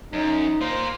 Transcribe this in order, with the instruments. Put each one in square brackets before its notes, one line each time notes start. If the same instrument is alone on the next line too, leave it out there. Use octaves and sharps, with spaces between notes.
[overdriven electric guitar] F#2 [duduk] D#4
[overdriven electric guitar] A#3 F4 [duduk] C5